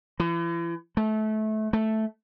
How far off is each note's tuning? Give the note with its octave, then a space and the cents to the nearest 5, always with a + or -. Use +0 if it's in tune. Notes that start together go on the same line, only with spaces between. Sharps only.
E3 +40
A3 -25
A3 -5